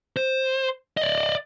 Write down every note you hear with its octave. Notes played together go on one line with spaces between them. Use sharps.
C5
D5 D#5